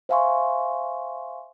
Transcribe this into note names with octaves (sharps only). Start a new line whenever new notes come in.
C5 E5 F5 G#5 C6 C#6